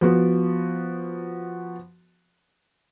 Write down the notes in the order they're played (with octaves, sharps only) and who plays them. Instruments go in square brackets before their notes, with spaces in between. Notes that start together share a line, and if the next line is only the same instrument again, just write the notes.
[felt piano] F3 B3 F#4